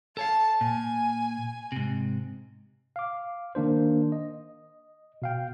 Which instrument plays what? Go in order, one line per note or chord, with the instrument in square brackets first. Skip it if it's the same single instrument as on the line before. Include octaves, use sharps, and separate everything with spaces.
[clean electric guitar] A4 C#5 F5 [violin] A5
[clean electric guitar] A#2 [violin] G#5
[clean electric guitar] G#2 C3
[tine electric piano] F5 D6
D#3 A#3 D4 C5
D#5
B2 F5 G5